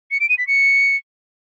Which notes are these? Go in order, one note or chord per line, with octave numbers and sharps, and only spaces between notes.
C#7
D7
D#7
B6
C#7